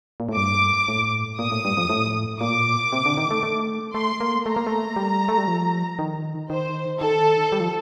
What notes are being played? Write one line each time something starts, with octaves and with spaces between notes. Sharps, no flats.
A#2
A2
G2 D6
A2
A#2 D#6
A2
G2
F2
A2
A#2 D6
C3
D3
D#3
A3
A3
A3 C6
A#3
A3 A#5
A#3
A3
G3
A3
G3
F3
D#3
D#3 C5
D#3 A4
G3
F3